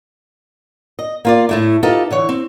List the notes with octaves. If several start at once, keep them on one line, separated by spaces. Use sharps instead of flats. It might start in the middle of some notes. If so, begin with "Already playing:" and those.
D#5
A#3 F4 D5
A2 A3 E4
D#4 F4 G4 A4 B4
D3 E3 C#5
C4